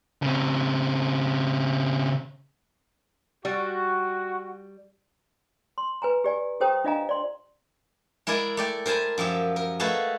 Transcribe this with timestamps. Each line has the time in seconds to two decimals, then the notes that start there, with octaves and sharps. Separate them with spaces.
0.22 C#3 C4
3.45 G3 F#4
5.78 C6
6.02 B4 G#5 A#5
6.24 G4 D5 G#5
6.61 G4 A4 C5 G5 A#5 D#6
6.84 D4 F4 D#5 F5 G#5 A#5
7.09 D5 C6
8.27 G#3 E4 A#4 D5 G#5
8.57 A3 D5 G5
8.86 A#4 C5 G#5 A5 B5
9.18 F#2 F3 G4 E5
9.56 A#4
9.80 G#3 A3 F#4 A4 B4 F5